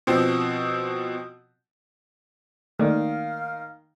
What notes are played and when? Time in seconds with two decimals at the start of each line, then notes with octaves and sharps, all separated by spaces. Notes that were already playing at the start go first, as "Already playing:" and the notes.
0.07 B2 F3 C4
2.79 D#3 A3 A#3 D5 F5 F6